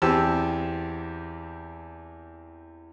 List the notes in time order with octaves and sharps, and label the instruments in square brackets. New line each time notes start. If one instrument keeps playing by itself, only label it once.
[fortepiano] E2 C4 G4 A5 E6